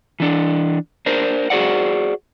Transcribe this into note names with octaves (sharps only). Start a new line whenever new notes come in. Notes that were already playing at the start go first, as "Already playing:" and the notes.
E3 D4
D4 A#4 C5
F#4 G#4 C5 D5 F#5